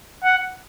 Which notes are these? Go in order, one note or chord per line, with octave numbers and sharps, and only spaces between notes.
F#5